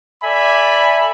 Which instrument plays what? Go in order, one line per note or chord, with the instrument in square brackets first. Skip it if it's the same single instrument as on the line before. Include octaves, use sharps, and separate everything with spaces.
[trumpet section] A4 D5 E5 G#5 B5